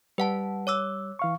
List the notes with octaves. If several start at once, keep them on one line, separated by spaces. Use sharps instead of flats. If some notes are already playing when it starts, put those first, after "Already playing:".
G3 B4 F#5 A5
C#5 D6 E6
E3 F5 C#6